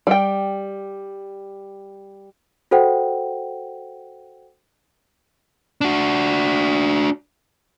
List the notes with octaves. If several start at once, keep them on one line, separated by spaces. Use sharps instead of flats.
G3 G5
F#4 A4 C5 F#5 G5
D4 F#4